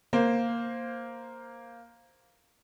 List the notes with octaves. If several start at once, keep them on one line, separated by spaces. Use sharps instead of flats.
A#3 C5